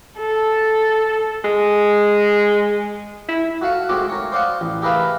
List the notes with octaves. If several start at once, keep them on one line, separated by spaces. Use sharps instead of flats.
A4
G#3
E4
F#4 A4 F5 F#5
G#2 A3 C4 F#4 G#5 D6
A#4 C#5
C5 D5 F5 F#5 D#6
A1
G4 G#4 A#4 B4 E5 F5